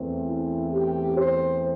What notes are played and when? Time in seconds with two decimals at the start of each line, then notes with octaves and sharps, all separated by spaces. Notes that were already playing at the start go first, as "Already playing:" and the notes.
Already playing: E2 E3 A3 C4
0.25 E4
0.71 G4
1.17 C5